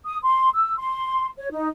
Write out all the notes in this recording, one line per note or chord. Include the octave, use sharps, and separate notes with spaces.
D#6
C6
E6
C6
C#5
D#4